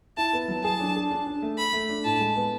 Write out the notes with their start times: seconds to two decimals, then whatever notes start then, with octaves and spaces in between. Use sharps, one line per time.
0.17 E4 A5
0.33 B3
0.48 F#3
0.64 G#4 A5
0.80 D4
0.96 G#4
1.11 D4
1.26 D4
1.42 A3
1.58 A4 B5
1.73 A3
1.89 D4
2.04 A2 A5
2.20 G#3
2.36 B3